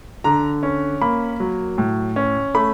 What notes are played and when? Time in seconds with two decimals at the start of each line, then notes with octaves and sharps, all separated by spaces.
0.24 D3 A#5
0.63 C#4
1.02 A#3 B5
1.40 F#3
1.78 A2
2.16 C#4
2.54 A3 B5